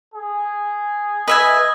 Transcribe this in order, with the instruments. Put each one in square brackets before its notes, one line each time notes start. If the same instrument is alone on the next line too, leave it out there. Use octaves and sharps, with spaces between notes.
[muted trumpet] G#4
[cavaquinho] B4 E5 G#5 [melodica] D#5